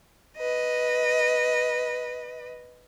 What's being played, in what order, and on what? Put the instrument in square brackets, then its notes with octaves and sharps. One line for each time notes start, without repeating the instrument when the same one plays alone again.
[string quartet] B4 D#5